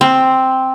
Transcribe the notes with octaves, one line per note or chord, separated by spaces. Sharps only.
C4